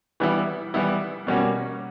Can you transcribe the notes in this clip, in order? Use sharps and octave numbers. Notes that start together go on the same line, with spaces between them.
E3 G3 B3 E4
E3 G3 B3 E4
B2 G3 A#3 C#4 F#4